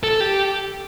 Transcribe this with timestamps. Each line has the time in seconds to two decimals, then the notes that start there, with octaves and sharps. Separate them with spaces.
0.03 A4
0.20 G4